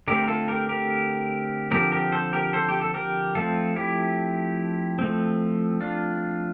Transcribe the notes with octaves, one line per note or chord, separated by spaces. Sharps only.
D3 A3 C4 G4 A#4
A#4
F4 A4
G4 A#4
G4 A#4
D3 F3 C4 G4 A#4
G4 A#4
A4 C5
G4 A#4
A4 C5
G4
A4
G4 A#4
F3 A3 C4 F4 A4
E4 G4
F3 A3 C4
D4 F4